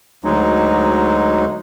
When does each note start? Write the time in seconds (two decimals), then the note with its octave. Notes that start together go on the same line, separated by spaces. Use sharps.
0.24 D2 F#3 G#3 D#4